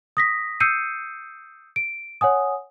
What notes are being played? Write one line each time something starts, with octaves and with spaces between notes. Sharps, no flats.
D#6 A#6 B6
D#6 E6 G6 C7 C#7 D#7
D7
C#5 F#5 G#5 D#6